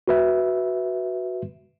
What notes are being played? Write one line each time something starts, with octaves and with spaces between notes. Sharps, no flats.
F#4 B4 E5